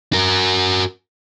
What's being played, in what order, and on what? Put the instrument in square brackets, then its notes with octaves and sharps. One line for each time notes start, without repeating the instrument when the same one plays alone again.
[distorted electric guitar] F#4 A#4